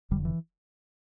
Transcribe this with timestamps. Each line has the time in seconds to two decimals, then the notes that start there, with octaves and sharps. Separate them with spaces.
0.11 F1 F2 D3 G3
0.25 E3